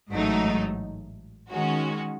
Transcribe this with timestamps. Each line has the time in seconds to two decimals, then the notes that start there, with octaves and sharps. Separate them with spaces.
0.10 A1 G#2 F#3 A3 D#4
1.51 D#3 G#3 C#4 F#4